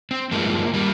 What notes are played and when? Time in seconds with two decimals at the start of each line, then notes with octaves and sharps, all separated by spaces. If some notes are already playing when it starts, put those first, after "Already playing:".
0.11 C4
0.31 G2 F3 G#3 A#3
0.74 G3 A#3